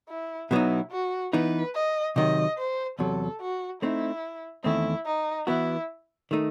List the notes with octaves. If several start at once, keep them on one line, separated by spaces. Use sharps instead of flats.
E4
B2 F#3 B3 D#4 E4
F#4
E3 B3 D#4 B4
D#5
C3 D#3 F#3 D#5
C5
E2 C3 F#3 A4
F#4
A3 C4 D#4 E4
E2 D#3 A3 C4 E4
D#4
E3 B3 E4 F#4
D#3 A3 D#4